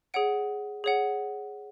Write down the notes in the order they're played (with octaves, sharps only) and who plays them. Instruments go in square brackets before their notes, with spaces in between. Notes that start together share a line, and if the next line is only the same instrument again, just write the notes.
[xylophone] G#4 C#5 F#5 D7
G#4 C#5 F#5